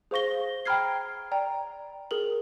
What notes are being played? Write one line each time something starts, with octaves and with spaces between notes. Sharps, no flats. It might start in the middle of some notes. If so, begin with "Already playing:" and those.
G#4 C5 F5 C#6 A#6 G7
G5 A#5 B5 F6 G#6 C7
D5 G5 A#5
G#4 A#4 F#7